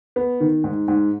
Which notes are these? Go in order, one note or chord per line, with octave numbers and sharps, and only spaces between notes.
B3
D#3
G#2
G#2